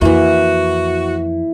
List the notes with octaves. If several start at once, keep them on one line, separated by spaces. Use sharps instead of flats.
F2 E3 A#3 E4 F#4